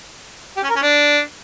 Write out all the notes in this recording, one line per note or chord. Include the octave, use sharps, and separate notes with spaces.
G4
C#4
A#4
C#4
D4